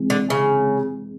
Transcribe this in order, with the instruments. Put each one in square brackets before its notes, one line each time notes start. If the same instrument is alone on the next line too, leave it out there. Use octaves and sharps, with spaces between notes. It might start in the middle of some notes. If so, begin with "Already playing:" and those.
Already playing: [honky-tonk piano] C3 E3 G#3
[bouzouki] D3
C#3